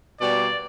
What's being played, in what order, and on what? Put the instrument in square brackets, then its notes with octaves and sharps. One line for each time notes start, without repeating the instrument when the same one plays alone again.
[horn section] B2 G3 A#3 D5